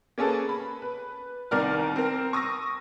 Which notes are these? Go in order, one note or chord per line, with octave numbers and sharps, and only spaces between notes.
A#3 C#4 G#4 A4 B4
B5
B4
C2 D#3 A#4 D5 F6
C4 A#4
C#6 D#6 E6 A#6